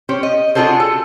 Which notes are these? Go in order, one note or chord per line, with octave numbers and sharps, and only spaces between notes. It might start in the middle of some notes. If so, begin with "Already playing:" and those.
C#4 G4 C5
D#5
D4 F4 F#4 G#4 A4 C5
A4